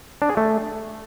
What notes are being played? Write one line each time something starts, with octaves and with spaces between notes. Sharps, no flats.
D4
G#4
A3